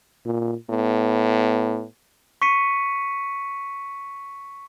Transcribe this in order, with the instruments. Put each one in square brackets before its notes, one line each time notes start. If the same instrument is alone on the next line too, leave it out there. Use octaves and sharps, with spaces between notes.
[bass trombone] A#2
[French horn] A2 [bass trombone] B3
[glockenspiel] C#6 B6 C#7 D#7